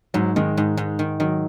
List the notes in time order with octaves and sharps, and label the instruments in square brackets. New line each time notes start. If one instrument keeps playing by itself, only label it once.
[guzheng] G#2 [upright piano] F#3
[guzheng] D#3 [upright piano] G#3
[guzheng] G#2
G#2
D#3
[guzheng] D#3 [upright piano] F#3